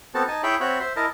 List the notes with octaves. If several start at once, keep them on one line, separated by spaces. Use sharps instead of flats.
B3 C4 F#4 A4 A5
D#4 G#5 A5
E4 G#4 C#5 E5 G5 B5
C4 F#4 C#5 E5 B5
C5 E5
E4 A#4 D#5 A5